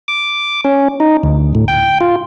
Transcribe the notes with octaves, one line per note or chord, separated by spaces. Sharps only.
D6
C#4
D#4
D2
A2
G5
F4